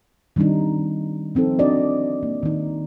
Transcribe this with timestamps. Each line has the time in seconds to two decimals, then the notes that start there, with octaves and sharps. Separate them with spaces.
0.36 D#3 G3 C4 D4 D#4
1.35 F3 C4 D#4 A4
1.59 D4 F#4 D5 D#5
2.23 A#3
2.43 D#3 D#4